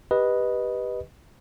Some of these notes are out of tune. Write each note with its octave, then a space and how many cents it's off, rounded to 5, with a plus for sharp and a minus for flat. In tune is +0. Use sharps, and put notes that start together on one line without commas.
G4 +5 B4 -10 D#5 +0